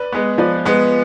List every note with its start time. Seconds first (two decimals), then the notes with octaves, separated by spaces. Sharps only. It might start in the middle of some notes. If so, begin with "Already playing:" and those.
Already playing: B4 D5
0.12 G#3 B3
0.38 F3 B4 D5
0.65 G#3 B3